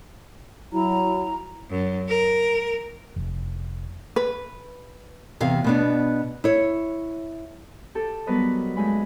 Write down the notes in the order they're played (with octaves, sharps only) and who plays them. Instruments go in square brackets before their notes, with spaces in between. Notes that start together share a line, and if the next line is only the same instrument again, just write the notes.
[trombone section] F#3 [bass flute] E4 [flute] A#5
[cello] F#2
A#4
[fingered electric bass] F1
[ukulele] B4
[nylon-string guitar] E2 C3 F5
B2 B3 D4
E4 C#5
[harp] G4 A4
F#3 G3 B3 A#4 B4 D#5
G2 G#3 A3 G#5 B5